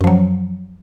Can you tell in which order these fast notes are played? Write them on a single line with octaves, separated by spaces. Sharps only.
F#2 F3 F#3